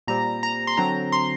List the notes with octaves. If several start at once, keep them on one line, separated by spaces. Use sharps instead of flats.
A#2 G3 C4 A#5
A#5
C6
D3 F#3 C4 A#5
C6